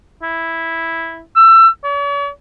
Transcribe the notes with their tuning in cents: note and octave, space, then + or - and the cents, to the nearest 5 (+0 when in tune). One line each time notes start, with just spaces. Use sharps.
E4 -5
E6 +25
C#5 +45